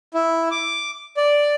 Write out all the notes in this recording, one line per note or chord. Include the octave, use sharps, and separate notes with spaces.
E4
D6
D5